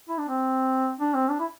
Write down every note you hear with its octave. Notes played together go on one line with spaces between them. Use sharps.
E4
D4
C4
D4
C4
D4
E4